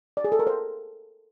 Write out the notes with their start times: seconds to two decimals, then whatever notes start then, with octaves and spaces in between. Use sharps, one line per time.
0.17 D5
0.24 G#4
0.32 A4
0.39 A#4
0.47 C5